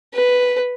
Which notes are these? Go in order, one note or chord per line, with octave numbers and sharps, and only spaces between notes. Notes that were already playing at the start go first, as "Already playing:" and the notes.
B4